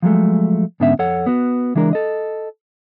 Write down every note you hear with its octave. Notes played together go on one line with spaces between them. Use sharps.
F3 F#3 G#3 A3
G#2 D3 B3 C#4 E5
F2 A4 C#5 F#5
B3 F#4
C#2 E3 G#3 D4 A#4
A4 D#5